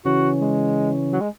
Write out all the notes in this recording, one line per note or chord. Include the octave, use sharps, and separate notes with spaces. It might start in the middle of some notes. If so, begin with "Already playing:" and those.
C#3 E3 C#4 F#4
G#3
F#3
G#3